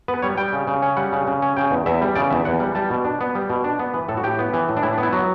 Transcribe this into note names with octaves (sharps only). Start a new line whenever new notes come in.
B3 B4
G3 C#5
G3 G5
C#3
C#3
C#4
G3 F#5
C#3
C#3
C#4
C#3 G5
E2
E2 E5
G3
C#3 D5
E2 E5
E2 F#5
G3
G3 A5
B2
D4
B3
G3
B2
D4
B3
E3 B4
A2 A4
F#4
A2 G4
B3
E3
A2
D4
A2 E4
D4
B3 E4
F#3 F#4